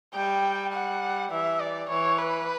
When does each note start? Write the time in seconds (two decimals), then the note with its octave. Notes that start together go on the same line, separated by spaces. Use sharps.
0.15 G3 G5
0.73 F#5
1.31 E3 E5
1.60 D5
1.89 E3 C#5
2.19 B4